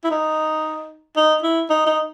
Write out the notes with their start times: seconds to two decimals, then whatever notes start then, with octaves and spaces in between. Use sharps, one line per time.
0.04 E4
0.11 D#4
1.17 D#4
1.43 E4
1.70 D#4
1.87 D#4